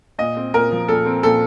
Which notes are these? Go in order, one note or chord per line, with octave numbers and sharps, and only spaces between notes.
A#2 D#5
C4
A#2 A#4
F3
A#2 A4
C4
A#2 A4